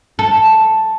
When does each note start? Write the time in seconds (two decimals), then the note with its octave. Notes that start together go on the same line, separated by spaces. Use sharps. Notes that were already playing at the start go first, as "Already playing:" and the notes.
0.19 A4